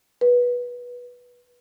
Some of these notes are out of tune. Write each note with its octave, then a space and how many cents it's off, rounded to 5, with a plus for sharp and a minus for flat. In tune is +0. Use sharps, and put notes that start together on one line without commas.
B4 -15